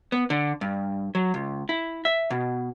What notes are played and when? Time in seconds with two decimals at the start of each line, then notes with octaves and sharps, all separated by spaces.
0.12 B3
0.30 D3
0.61 G2
1.15 F#3
1.34 C#2
1.69 E4
2.05 E5
2.30 B2